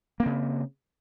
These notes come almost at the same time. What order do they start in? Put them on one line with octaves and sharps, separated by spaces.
A#3 C4 C#3